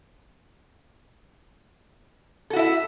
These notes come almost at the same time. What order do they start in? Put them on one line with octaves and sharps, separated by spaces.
A4 F#4 E4 E5